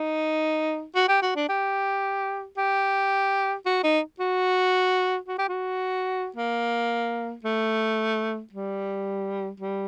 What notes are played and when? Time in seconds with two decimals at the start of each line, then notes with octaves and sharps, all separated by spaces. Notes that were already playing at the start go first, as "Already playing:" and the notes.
Already playing: D#4
0.95 F#4
1.08 G4
1.22 F#4
1.36 D4
1.49 G4
2.57 G4
3.65 F#4
3.84 D#4
4.20 F#4
5.28 F#4
5.38 G4
5.49 F#4
6.36 A#3
7.44 A3
8.52 G3
9.60 G3